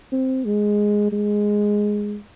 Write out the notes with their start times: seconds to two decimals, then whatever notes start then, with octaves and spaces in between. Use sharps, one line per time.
0.12 C4
0.45 G#3
1.12 G#3